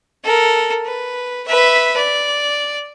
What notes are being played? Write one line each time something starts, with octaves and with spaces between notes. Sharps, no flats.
A4 A#4
B4
B4 E5
D5